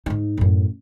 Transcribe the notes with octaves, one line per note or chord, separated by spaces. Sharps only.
G#2 D#4
F#2 A2